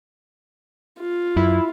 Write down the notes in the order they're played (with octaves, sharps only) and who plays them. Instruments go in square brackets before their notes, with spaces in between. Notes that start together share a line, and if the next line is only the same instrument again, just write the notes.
[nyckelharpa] F4
[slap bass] F#2 [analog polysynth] E4